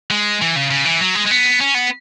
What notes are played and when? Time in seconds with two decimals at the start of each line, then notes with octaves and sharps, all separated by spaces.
0.11 G#3
0.41 E3
0.56 C#3
0.71 C#3
0.85 E3
1.01 F#3
1.15 G#3
1.26 G#3
1.31 B3
1.60 C#4
1.75 B3